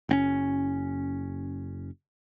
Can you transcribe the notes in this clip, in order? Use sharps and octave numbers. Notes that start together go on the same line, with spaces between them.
F#1 C4 C#4